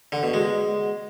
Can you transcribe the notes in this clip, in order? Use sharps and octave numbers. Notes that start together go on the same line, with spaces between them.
D3
B2
G#3